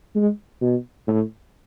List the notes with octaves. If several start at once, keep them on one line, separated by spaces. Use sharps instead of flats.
G#3
B2
A2